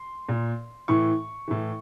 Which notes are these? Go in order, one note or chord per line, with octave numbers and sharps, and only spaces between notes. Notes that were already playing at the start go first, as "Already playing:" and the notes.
Already playing: C6
A#2
A2 E3 C#6
A2 E3